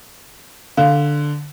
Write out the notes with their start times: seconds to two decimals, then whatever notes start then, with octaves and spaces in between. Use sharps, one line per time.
0.77 D3 F5